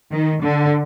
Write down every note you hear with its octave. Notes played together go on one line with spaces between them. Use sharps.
D#3
D3